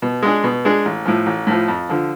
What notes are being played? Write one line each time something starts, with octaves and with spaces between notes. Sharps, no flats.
B2
G#3 D4 G#4
B2
G#3 D4 G#4
A1
A2 F3
A1
A2 F3
F2
D3 F3